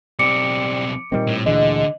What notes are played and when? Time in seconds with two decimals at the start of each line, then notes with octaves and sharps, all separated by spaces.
0.19 B1 G3 C4 D6 C#7 D7
1.12 A#2 D#3 G3 C4
1.28 A2
1.46 D2 A#2 D3 E3 G#3 D#5